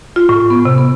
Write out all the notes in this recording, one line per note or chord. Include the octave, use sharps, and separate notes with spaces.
F4
A2
B3
C3
B3